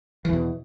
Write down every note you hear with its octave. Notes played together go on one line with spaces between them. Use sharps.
E2 B2 E3